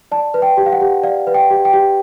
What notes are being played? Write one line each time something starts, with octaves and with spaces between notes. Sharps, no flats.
D5 A5
B4
G5
G4
F5
F#5
G4
D5 F5
B4
G5
G4
G5
G4